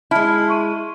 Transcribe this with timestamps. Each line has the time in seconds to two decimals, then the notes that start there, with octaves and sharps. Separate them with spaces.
0.11 G#3 E4 A5 B5 F6
0.48 C6 C#6 D#7